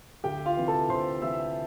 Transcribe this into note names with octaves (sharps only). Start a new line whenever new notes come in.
D2 G4 G5
F4 F5
C3 E3
A4 A5
D2 C5 C6
C3 E3 E5 E6